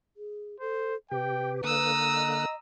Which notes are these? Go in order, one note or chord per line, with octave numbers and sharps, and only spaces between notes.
G#4
A4 C5
C3 G4 B4 G5
D3 A#3 A#5 D#6 E6 F#6
D#5